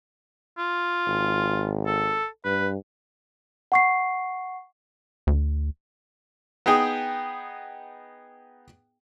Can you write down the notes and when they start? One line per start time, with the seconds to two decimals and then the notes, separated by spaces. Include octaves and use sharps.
0.59 F4
1.07 G#1
1.87 A4
2.45 G2 B4
3.72 F#5 C#6 C7
5.27 D2
6.66 B3 D#4 G#4 G5